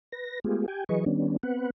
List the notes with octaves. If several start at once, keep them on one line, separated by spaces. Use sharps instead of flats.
B4 A#6
G#3 A3 B3 F4 G4 G#4
G4 G5 G#5
E3 F#3 G#4 B4 D#5 C#6
D#3 G3 B3 C#4 D4
B3 C4 B4 F#5